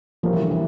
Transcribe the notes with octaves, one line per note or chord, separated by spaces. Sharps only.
F3 G3 A#3 C#4 G4 A#4
E3
D3
E3